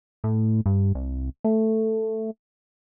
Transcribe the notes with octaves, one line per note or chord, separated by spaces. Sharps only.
A2
G2
C2
A3